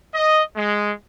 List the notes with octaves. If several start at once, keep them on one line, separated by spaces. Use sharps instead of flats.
D#5
G#3